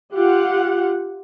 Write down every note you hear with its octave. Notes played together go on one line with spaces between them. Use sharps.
F4 G4 F#5